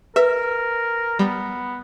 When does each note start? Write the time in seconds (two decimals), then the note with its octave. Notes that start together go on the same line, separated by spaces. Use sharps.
0.16 A#4 B4 E5
1.19 G3 B3